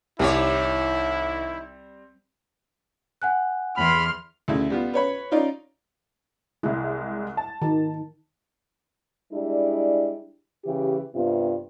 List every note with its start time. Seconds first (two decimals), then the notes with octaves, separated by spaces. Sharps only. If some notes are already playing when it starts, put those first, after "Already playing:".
0.19 C2 D#3 G3 C4 E4 G4 C#5
3.22 F#5 G#5 F#6
3.77 E2 B5 C6 F6
4.48 D2 C#3 E4
4.70 G3 B3 F4
4.94 B4 C#5 B5
5.31 C#4 D#4 F4 D5
6.63 C2 G#3 E4
7.37 A5
7.62 D#3
9.32 G3 G#3 D4 E4 G#4
10.64 C#3 E3 G4
11.14 G2 C3 B3 F4